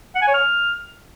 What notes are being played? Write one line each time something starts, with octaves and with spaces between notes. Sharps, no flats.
F#5
G#5
C#5
F6